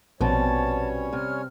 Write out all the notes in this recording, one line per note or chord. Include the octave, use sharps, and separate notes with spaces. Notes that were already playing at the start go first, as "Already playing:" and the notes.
A#1 B2 G3 C4 C#4 C#5 A5
C3 F6